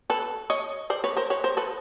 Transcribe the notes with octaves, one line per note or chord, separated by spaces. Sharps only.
A4 B4
C#5 D#5
C5 D5
B4 C#5
A#4 C5
B4 C#5
A#4 C5
A4 B4